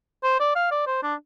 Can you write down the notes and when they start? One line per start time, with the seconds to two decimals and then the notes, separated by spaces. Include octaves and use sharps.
0.24 C5
0.40 D5
0.56 F5
0.71 D5
0.87 C5
1.03 D4